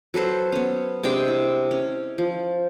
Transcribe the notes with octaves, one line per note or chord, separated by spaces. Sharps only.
F#3 A4 B4 C5
B3 C#4
C3 G#3 D4 G5
E4
C#4
F3